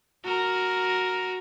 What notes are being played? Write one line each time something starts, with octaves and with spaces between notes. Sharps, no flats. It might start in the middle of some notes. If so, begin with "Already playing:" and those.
F#4 A#4